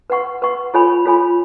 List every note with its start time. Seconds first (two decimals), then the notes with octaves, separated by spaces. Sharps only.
0.10 B4 F#5 C#6
0.42 B4 F#5 C#6
0.74 F4 A4 C#5 G#5 B5
1.05 F4 A4 C#5 G#5 B5